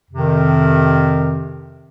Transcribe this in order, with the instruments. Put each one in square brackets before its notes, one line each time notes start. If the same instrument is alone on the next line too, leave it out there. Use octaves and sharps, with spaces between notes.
[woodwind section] F2 C3 D#3